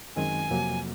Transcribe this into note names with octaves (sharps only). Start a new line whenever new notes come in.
F#2 D#3 G#3 C4 G#5
F2 C3 F#3 A#3